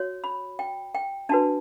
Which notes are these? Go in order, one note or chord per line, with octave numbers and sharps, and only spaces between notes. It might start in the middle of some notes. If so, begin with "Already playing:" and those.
Already playing: F#4 C#5
B5
G5
G5
D4 F#4 B4 A5